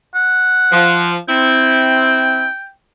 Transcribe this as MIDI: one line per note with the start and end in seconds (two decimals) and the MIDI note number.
0.15 1.12 78
0.72 1.18 53
1.29 2.48 60
1.29 2.48 64
1.29 2.71 79